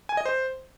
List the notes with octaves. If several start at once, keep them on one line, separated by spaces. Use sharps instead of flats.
G#5
D#5
C5